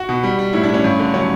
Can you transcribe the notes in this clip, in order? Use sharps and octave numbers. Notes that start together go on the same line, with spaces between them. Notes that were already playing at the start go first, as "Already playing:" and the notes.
Already playing: F#4
B2
G3
G3
A2 E4
D4
A2
C#4
G2
D3
F#3 C#4